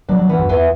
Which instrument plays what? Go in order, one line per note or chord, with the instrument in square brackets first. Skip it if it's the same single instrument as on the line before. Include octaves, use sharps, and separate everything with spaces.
[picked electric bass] F#3 [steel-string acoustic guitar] D4
[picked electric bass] F#3
[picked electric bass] E3 [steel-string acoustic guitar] B3
[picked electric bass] F#2
[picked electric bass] E2 [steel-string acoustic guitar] E3